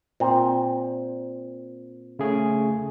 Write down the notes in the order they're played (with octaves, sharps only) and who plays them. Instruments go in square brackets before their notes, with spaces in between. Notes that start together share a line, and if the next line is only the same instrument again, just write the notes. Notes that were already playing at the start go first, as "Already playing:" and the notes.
[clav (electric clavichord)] A#2 C4
[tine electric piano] C#3 A3 G#4